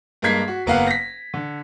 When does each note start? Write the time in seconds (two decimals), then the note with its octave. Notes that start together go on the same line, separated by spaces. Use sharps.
0.22 G2 G#3 A#3 G#6 B6 C7
0.48 F#4
0.66 F#1 A#3 B3 F5 F#5
0.87 A#6 B6
1.34 D3